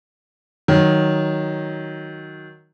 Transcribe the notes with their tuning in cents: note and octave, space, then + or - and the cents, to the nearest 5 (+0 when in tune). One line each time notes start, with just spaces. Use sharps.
D#3 +0 F#3 +0